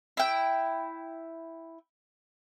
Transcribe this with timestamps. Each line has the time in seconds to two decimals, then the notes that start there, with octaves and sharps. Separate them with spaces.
0.17 E4 G5